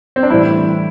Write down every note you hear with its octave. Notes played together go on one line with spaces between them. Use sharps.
C4
D4
A2 E3 G3 E4